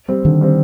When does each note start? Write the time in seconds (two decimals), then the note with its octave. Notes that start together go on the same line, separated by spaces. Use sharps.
0.08 G3 C4
0.25 D3 D#3
0.41 G3 C4